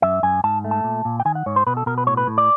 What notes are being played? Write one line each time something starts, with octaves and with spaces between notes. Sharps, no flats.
F#2 E5
F#2 G#5
G#2 A5
A3
A5
A#2
A#2
G5
D#3 G#5
F#5
G#2 C#5
C5
B2 B4
A4
B2 A#4
B4
A2 C#5
B4
A2
D5